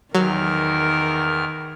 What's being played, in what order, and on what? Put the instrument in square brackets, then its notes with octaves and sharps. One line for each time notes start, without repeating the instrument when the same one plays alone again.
[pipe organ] E2 F6 [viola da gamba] D#3 [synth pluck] F#3 [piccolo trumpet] A#4